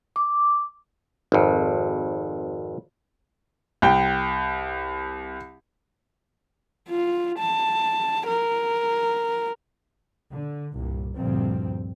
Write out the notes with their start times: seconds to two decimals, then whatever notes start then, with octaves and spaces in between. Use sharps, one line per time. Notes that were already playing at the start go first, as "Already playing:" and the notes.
0.16 D6
1.32 G#1 F2
3.82 C2 G5
6.89 F4
7.39 A5
8.27 A#4
10.31 D3
10.73 C2 G2 A#2
11.16 D2 G2 A#2 F3 C4